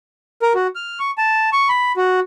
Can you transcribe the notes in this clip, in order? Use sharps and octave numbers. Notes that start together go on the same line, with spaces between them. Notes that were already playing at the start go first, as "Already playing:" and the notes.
A#4
F#4
F6
C#6
A5
C#6
B5
F#4